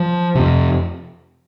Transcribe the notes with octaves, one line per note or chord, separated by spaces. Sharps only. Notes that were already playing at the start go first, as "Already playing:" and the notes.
Already playing: F3
F2 C3